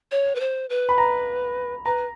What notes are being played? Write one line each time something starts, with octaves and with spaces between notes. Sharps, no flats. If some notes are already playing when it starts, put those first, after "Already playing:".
C#5
B4
C5
B4
B5
A#5
B4 A#5